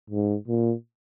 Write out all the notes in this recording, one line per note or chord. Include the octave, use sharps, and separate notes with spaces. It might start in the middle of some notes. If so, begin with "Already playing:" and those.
G#2
A#2